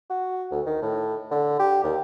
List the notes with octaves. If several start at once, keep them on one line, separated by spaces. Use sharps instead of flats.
F#4
D2
D#3
A2
D3
G4
D#2